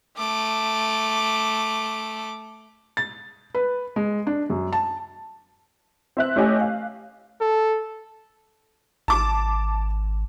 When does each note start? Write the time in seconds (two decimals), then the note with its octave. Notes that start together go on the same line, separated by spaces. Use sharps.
0.17 A3 D6
2.97 A6
3.55 B4
3.96 G#3
4.27 D4
4.50 F#2
4.73 A5
6.17 C4 E5 F#6
6.36 A3 C#4 G4 D#5 G#5
6.61 F5
7.41 A4
9.08 G#1 A5 D6